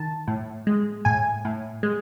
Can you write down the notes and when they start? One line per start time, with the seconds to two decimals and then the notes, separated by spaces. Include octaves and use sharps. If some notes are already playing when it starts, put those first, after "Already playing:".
Already playing: D#3 A5
0.28 A2
0.67 G#3
1.05 A2 G#5
1.45 A2
1.83 G#3